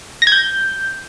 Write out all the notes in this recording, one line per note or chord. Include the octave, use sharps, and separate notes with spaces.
A#6
G#6
G6